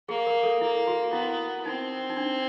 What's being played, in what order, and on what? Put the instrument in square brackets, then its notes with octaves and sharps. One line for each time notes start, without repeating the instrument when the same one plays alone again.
[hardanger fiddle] A#3 [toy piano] G#4
[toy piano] A#4
A4
[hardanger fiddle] A#3 [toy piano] E4
[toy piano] F#4
[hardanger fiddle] B3 [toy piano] E4
[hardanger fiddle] C4 [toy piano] D#4
[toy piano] D#4
D4